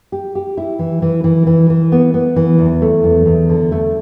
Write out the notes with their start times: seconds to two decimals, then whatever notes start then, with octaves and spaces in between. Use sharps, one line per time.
0.12 G4
0.35 G4
0.57 E4
0.79 E3
1.02 E3
1.24 E3
1.47 E3
1.70 E3
1.92 B3
2.14 B3
2.36 E3
2.58 E2
2.82 A3
3.04 E2
3.26 E2
3.49 D3
3.72 A3